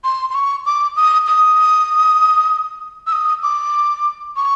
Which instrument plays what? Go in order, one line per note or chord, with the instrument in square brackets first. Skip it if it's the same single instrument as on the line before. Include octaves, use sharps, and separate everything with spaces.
[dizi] C6
C6
C#6
D6
D#6
D#6
E6
D#6
D6
C#6